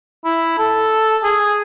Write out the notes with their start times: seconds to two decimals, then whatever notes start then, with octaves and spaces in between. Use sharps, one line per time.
0.25 E4
0.58 A4
1.24 G#4